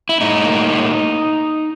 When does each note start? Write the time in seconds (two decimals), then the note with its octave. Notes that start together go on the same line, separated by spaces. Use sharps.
0.09 E4
0.21 A2 D#4
0.44 A#3
0.67 A2